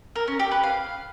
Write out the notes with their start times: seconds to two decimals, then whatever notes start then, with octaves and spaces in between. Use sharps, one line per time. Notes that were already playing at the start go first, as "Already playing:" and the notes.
0.16 A#4
0.28 C#4
0.39 G4
0.51 B4
0.63 F5